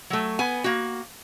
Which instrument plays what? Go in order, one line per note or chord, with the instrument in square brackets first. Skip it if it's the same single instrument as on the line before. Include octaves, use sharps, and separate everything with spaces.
[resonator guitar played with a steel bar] F#3 A3
B3 G#5
A#3 F#4